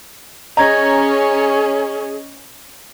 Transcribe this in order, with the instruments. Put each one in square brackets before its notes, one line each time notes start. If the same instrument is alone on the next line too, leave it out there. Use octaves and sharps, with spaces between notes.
[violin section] C#4 [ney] G#4 [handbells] D#5 G#6 [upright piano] A#5